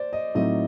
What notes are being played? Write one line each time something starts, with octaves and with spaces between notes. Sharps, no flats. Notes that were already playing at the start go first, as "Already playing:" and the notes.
Already playing: C5 D5
D#5
A2 F#3 A3 C4 D#4 D#5